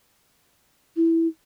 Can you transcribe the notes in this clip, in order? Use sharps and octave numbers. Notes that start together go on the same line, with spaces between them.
E4